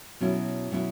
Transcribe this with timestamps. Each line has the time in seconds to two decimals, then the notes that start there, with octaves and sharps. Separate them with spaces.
0.21 B2 F#3 C#4 E4
0.71 B2 F#3 C#4 E4